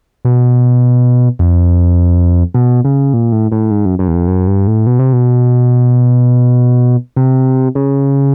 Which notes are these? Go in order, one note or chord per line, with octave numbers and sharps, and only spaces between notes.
B2
F2
B2
C#3
A#2
A2
A2
G#2
F#2
F#2
E2
F2
F#2
G2
A2
B2
C3
B2
C3
C#3